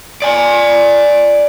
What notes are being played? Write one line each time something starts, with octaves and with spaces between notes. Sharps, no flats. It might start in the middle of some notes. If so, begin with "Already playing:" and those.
D5 G#5